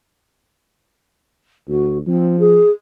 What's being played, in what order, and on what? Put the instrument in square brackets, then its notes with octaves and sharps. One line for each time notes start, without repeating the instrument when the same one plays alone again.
[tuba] D2 [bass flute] F#4
[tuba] F3 [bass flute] C4
[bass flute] G#4